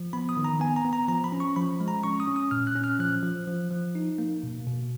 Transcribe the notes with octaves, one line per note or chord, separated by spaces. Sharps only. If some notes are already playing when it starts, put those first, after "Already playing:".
Already playing: F3
B3 B5
D#6
D#3
A#5
B3 G#5
A#5
B3
A#5
F3 A#5
B5
C#4
C#6
F3 B5
G#3
A#5
C#4 C#6
D#6
C#4
D#6
A#2 F6
F#6
C#4
F6
F3 F#6
F3
F3
F3
D#4
A#3
B2
B2